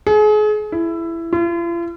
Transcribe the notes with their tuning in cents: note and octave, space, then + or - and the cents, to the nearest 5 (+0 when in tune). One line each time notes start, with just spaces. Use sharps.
G#4 +35
E4 +15
F4 -45